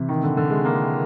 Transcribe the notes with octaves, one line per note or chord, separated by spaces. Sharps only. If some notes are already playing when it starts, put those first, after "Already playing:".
Already playing: C3 E3
D#3
D3
D3
G#3
A#3